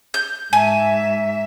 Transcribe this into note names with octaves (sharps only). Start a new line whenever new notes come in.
G6
G#2 E5 G#5